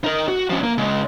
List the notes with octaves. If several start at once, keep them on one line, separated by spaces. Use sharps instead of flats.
D#4 A#4
F#4
F3 C#4
A#3
C#3 G#3